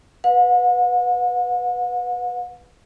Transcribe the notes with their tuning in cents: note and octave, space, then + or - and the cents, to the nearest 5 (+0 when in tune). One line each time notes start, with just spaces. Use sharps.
B4 +0 F#5 -40